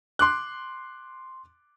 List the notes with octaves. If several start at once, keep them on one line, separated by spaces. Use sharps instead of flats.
C6 D6 F#6